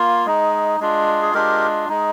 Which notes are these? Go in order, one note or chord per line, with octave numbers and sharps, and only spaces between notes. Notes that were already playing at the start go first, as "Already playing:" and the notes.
Already playing: A#3 F4
G#3 D#4
G#3 D4 F4
G#4
G#3 D4 F4 G4 A#4
G#3 D#4